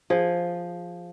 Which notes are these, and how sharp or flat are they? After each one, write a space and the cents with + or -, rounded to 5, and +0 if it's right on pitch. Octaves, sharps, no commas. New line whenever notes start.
F3 +0 G#4 -15